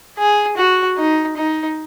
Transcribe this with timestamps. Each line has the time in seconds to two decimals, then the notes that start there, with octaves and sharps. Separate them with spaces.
0.18 G#4
0.57 F#4
0.98 D#4
1.37 D#4